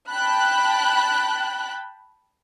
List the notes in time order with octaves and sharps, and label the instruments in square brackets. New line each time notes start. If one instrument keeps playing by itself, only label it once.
[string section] G5 A5 B5 F#6